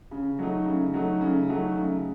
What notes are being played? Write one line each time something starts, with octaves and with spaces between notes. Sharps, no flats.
C#3
F#3 A3 D#4
C#3
F#3 A3 D#4
C#3
F#3 A3 D#4
C#3